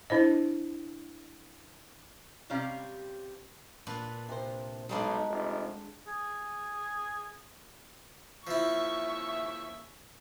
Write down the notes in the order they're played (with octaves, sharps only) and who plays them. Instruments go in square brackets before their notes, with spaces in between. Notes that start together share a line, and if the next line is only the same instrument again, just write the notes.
[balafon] D4 E4 C5 D#5
[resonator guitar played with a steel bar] C3 G3 C#4 G4 F5 A#5
[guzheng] A#2 D4 B4
[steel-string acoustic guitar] C3 C5
[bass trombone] B1 [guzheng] G3 G#3 D4 [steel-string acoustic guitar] D#4
[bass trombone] F1
[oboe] G#4
[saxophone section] D#2 C#3 E5 [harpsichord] F3 E4 [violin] C#6